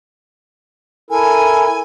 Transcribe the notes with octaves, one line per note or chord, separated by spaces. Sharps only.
E4 A4 A#4 G#5